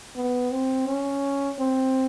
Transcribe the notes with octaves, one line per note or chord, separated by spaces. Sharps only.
B3
C4
C#4
C4